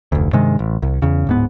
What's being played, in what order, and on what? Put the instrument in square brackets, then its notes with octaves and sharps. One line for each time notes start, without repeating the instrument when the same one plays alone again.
[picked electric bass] F1 D2
G2 C3 D#3 G#3
A1
C2
E2 C#3
D1 G#2 B3